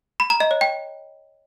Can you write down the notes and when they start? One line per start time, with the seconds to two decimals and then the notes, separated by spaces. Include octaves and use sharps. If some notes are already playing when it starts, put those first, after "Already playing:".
0.20 B5
0.30 A#5
0.40 D#5
0.51 C#5
0.61 G5